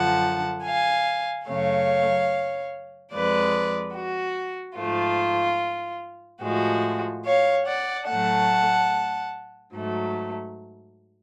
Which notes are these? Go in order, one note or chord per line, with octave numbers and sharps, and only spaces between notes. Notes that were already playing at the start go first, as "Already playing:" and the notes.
Already playing: F#2 D3 F3 F#5 A5
F5 G#5
F#2 C#3 F#3 A3 C#5 F5
F2 F3 G#3 B4 D5
F#4
G#2 F3 A3 F4
A2 F3 G#3 F#4
C#5 F5
D5 F#5
A2 F#3 A3 F#5 A5
G#2 F#3 A3